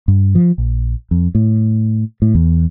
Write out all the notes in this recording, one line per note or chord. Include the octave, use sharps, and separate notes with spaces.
G2
F3
A#1
F2
A2
A2
E2